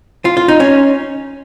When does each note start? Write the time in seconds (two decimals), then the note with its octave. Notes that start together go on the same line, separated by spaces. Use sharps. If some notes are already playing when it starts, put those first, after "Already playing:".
0.25 F4
0.37 F4
0.48 D#4
0.60 C#4